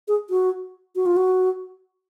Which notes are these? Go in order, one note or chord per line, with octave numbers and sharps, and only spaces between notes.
G#4
F#4
F#4
F4
F#4